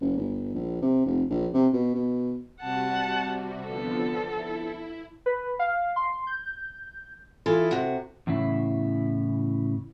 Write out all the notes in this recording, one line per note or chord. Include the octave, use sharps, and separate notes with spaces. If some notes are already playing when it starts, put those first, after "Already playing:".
F#1
G1
A#1
C3
F1
A#1
C3
B2
B2
C3 G3 F#4 F#5 A5
D3 F3 B3 A4
E4
B4
F5
C6
G6
E3 E4 F4 G#4 A4
C3 F#4
E2 A2 C#3 E4